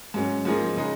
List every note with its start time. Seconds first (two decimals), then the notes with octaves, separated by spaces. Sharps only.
0.14 G#2 F#3 C#4
0.45 G#2 F3 A#3 D#4 G#4
0.77 C#3 G#3 D#4